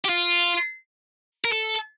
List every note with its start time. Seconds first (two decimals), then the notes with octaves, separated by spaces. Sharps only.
0.05 G4
0.09 F4
1.45 A#4
1.52 A4